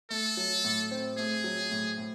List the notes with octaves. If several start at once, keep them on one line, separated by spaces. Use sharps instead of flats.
A3 A4
F#3
A2
C4
A3 G#4
F#3
A2
A2